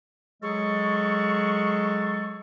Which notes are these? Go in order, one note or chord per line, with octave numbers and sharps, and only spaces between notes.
F#3 G#3 G#4 A4 C#6